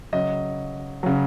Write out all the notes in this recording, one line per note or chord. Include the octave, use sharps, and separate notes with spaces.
C#3 F#3 D#5
C#3 F#3